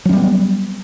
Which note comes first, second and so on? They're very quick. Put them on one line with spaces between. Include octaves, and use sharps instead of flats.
F#3 C#4 G3 B3